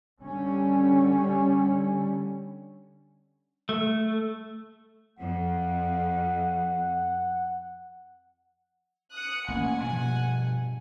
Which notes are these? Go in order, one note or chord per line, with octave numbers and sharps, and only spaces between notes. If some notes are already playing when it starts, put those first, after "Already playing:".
D3 G3 C#4
A3
F2 F#5
D#6 F#6 C#7
A1 A#3 C#4 F#5 G#5
G2 B2 F3